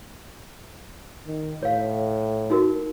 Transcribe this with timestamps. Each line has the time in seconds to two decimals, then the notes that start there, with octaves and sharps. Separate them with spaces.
1.27 D#3
1.63 A2 C#5 F5
2.50 D#4 F#4 A#4